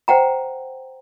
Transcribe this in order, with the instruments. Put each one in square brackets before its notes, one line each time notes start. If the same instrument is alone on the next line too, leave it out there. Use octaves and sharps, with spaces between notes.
[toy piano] C5 F#5 G5 A#5